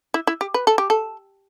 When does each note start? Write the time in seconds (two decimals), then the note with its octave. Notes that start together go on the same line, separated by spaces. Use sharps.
0.14 E4
0.27 E4
0.41 G4
0.54 B4
0.67 A4
0.78 G4
0.90 A4